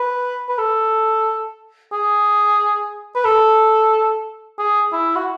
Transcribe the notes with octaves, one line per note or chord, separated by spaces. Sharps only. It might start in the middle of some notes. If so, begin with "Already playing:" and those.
Already playing: B4
B4
A4
G#4
B4
A4
G#4
E4
F#4